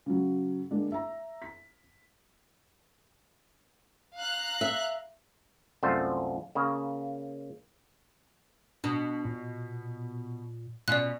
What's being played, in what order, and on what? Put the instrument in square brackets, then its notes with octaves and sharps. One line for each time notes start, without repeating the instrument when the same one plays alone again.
[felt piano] C#3 F#3
D3 G#3 A#3 D4
E5 A#5
B6
[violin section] F5 A#5 F#6
[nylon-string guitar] E5
[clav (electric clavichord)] C2 F#2 A3 F4 C5
C#3 A#3
[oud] B2 [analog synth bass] D4
[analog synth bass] A#2
[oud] B2 C#4 F4 [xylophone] D5 F#6